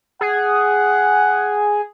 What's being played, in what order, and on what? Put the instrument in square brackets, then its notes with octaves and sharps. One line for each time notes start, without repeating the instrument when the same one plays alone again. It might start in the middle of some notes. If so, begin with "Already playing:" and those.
[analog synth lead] G#4 [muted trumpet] F#5